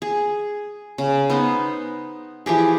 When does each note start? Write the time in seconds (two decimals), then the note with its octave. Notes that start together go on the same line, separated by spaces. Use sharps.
0.02 G#4
0.98 C#3
1.30 B3 D#4 C5
2.46 E3 F3 G4 G#4